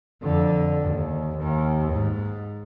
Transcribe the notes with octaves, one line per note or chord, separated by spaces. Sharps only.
F2 D3
D#2
D#2
G#2